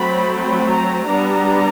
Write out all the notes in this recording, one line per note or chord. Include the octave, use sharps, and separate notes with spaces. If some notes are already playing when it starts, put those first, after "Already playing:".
Already playing: F#3 A3 C4 B5
B5
A#5
G3 B3 D4 A#5